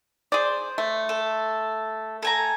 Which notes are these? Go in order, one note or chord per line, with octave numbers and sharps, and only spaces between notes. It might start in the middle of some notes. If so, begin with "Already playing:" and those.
G#4 C5 D5
A3
A4
A4 G#5 A#5